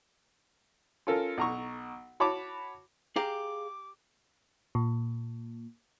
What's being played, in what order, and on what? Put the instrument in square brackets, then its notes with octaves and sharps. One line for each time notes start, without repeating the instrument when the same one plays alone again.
[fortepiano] C#4 F4 A4 A#4
B1 A#5 C#6
F#4 C#5 A5 B5 D6
[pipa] G4 [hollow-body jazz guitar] G#4 F5 A#5 [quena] D6
[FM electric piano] A#2